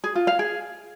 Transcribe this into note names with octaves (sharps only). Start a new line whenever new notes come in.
G#4
F4
F5
G#4